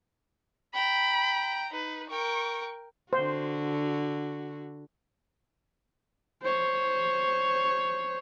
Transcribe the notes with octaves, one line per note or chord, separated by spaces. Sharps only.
G5 A#5 B5
D#4 B4
A#4 G5 C#6
D3 F#4 C5
C5 C#5